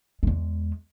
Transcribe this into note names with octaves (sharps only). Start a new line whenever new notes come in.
E2 G#3